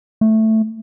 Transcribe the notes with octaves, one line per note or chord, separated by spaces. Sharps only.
A3